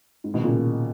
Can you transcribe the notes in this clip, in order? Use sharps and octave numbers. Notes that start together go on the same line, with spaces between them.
G#2
B2 D#3
A#2 C#3